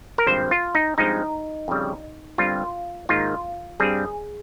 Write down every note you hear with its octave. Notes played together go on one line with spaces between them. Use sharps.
A#4
G#1 G2 F3 C4 C5
F4
D#4
G2 F3 G#3 C4 D#4
F2 C#3 G3
G1 G2 G3 C4 F4
G#2 D#3 A#3 F4
G2 G3 C4 G#4